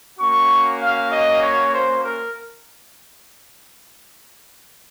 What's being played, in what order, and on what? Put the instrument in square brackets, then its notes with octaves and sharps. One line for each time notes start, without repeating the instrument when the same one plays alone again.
[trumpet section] A#3 C#4 F#4 C#6
F5
D#5
C#5
C5
A#4